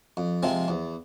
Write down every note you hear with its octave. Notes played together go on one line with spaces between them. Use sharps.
F2
C3 F3 G#3 C4
E2